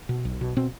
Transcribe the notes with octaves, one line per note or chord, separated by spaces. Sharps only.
B2
B1
B2
B2 C4